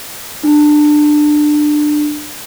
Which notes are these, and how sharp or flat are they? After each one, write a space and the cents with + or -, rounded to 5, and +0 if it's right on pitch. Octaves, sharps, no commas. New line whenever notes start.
D4 +20